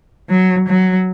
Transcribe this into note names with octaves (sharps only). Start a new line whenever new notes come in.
F#3
F#3